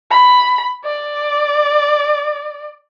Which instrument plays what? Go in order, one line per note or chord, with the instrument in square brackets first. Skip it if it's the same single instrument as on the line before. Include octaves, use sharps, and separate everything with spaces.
[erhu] B5
D5